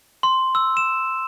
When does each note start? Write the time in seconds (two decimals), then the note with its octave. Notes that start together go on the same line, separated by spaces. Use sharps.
0.23 C6
0.55 E6
0.77 E7